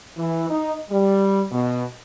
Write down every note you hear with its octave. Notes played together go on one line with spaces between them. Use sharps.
E3
D#4
G3
B2